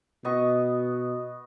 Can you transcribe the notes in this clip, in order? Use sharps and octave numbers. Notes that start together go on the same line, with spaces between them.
B2 B3 D#5 C#6